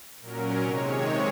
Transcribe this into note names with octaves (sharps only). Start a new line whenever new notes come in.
A#2 F#3 C#4 A#4
C3 D#3 G#3 C#5